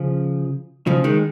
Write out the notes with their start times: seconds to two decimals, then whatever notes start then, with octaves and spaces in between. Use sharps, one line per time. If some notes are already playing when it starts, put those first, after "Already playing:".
Already playing: C#3 F3
0.87 C#3 F3
1.04 D#3 G#3